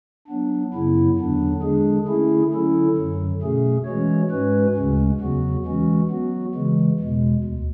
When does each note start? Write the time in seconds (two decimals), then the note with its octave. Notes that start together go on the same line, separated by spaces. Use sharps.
0.28 F#3 B3 D4
0.73 F#2 C#3 F#3 B3 E4
1.18 E2 D3 F#3 B3 D4
1.62 D3 G#3 D4 G#4
2.07 D3 A3 C#4 E4 G#4
2.52 D3 F#3 C#4 E4 A4
2.96 F#2 D3 F#3
3.42 B2 A3 C#4 G#4
3.86 E3 G#3 C#4 F#4 C#5
4.31 G#2 G#3 C#4 F#4 B4
4.75 D2 C#3 G#3 C#4
5.20 E2 C#3 F#3 B3 F#4
5.66 E3 G#3 C#4 F#4
6.10 F#3 B3 F#4
6.54 C#3 E3 G#3
6.99 E2 B2 G#3
7.43 D2